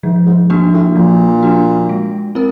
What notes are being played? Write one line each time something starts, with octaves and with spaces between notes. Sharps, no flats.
G#2 F3
G#2
G#2 A#3 D4 F#4
A2
A#2 F3
A#3 D4 F#4
G#3
C4 E4 A#4